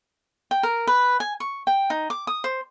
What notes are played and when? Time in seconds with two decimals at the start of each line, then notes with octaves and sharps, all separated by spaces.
0.51 G5
0.63 A#4
0.87 B4
1.20 G#5
1.40 C#6
1.67 G5
1.90 D#4
2.10 D6
2.27 D#6
2.44 C5